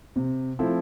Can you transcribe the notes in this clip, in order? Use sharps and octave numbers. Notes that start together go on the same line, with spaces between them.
C3
F3 A3 C4 E4